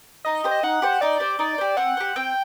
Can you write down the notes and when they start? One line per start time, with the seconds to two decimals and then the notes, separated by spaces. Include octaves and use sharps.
0.25 D#4 D#5
0.44 G4 C5
0.51 D#5
0.63 D#4 F#5
0.82 G4 C5
1.01 D#4 D5
1.20 G4 C5
1.39 D#4 D5
1.58 G4 C5
1.77 C4 F#5
1.97 G4 C5
2.16 C4 G5